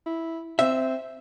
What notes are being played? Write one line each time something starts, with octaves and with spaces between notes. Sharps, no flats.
E4
C4 E5